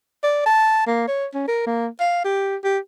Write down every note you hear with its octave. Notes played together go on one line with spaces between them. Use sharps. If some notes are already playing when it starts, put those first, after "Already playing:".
D5
A5
A#3
C#5
C#4
A#4
A#3
F5
G4
G4